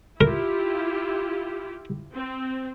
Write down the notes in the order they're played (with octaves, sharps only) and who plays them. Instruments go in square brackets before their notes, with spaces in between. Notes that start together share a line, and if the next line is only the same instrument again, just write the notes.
[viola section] E4 F4 G4 [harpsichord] A#4
[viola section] C4